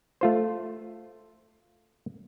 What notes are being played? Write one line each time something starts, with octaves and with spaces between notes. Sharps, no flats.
A3 F4 C5